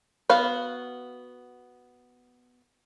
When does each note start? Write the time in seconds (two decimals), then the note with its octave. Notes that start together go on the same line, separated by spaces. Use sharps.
0.30 B3 F#4 F5